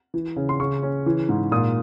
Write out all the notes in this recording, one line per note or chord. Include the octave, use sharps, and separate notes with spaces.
E3
C#3
C6
C#3 C#6
C#4
E3
G#2
A#2 D#6